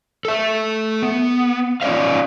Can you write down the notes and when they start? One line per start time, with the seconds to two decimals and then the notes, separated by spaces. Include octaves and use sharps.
0.25 A4 E5
1.03 B3
1.82 C#4 F4 D5 D#5 F5